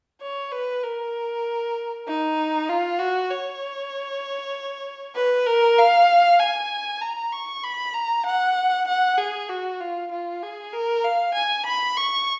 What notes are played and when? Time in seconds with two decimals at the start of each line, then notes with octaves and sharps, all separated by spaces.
0.21 C#5
0.52 B4
0.83 A#4
2.07 D#4
2.69 F4
2.99 F#4
3.30 C#5
5.16 B4
5.46 A#4
5.79 F5
6.40 G#5
7.01 A#5
7.32 C#6
7.64 B5
7.94 A#5
8.26 F#5
8.87 F#5
9.18 G#4
9.49 F#4
9.80 F4
10.11 F4
10.43 G#4
10.73 A#4
11.04 F5
11.34 G#5
11.66 B5
11.97 C#6